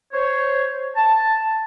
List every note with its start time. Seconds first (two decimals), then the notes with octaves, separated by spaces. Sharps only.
0.13 C5 C#5
0.96 A5